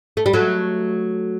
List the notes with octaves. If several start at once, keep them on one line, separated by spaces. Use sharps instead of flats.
A3
G3
F#3 A3